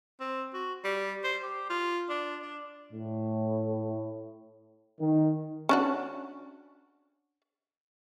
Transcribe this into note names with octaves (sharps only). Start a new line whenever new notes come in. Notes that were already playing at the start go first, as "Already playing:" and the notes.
C4
F#4
G3
C5
G4
F4
D4
D4
A2
D#3
C#4 D4 F#4